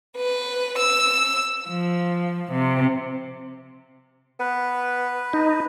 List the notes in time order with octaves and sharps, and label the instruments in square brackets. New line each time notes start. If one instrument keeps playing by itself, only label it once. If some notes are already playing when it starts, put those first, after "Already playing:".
[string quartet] B4
E6
F3
C3
[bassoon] B3 [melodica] B4
[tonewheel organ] D#4